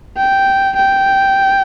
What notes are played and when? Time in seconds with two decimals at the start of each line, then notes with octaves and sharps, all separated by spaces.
0.17 G5
0.76 G5